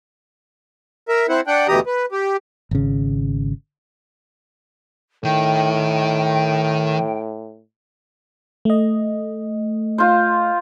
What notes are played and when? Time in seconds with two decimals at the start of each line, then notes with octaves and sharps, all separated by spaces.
1.09 A#4 E5
1.29 C4 E4 C5 F#5
1.47 D4 F#5 G5
1.68 D2 B2 E3 G4 A#5 D#6
1.86 B4
2.12 G4
2.71 G#1 C#3
5.25 A2 D#3 G5
8.65 A3 D#5
9.98 F4 C5